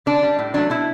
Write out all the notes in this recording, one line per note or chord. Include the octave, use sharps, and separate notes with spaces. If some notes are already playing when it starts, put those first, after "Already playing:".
D3 D4
G3
A2
F#3 A3 D4
B2 E4